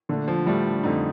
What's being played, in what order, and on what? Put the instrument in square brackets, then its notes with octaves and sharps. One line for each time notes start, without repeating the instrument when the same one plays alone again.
[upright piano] A#2 A3 D4 [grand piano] D3
[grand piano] F3
[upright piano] A2 A3 D4 [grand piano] G3
[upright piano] F2 D3 A3 D#4